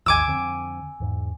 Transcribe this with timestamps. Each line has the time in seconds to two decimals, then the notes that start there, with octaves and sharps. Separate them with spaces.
0.06 G#1 D#2 G#5 D6 E6
0.27 F2 D3 C4
1.00 E2 G#2